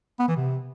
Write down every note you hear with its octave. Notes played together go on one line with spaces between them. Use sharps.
B3
E3
C3